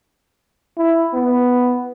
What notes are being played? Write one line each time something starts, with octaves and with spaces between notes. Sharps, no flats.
E4
B3